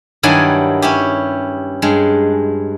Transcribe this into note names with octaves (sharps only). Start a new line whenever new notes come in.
G2 D#3 F#3 E4 D5 G#5
C#4 E4 G4
G2 G#3